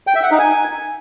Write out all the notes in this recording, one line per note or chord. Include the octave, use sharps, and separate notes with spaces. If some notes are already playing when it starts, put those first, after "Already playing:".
G5
E5
F#5
D#4
G#5